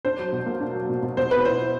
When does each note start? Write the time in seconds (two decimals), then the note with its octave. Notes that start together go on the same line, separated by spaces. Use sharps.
0.05 D4 C5
0.19 F#3
0.33 B2
0.46 A#3
0.60 D4
0.75 F#3
0.90 B2
1.03 B2
1.17 B2 C5
1.31 B3 B4
1.45 E4 C5
1.60 E4